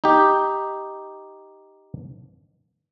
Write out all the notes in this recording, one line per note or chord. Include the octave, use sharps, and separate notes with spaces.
D#4 G4